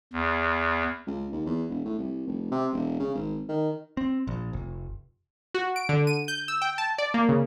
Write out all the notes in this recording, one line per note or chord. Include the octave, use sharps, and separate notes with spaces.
E2
C#2
D#2
E2
E1
A2
C2
F1
C3
E1
C#3
G#1
D#3
C4
A#1
F1
F#4
D7
D3
D#7
G6
E6
G5
A5
D5
A#3
C#3